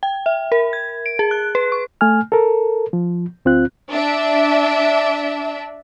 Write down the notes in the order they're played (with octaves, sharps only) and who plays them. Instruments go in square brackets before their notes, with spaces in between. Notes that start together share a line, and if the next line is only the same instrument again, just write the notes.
[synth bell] G5
E5
A#4
G#6
D7
G#4
F#6
B4
C#6
[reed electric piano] A3 G#5 F6
A4 A#4
F3
D2 C4 F4 F#6
[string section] D4 E5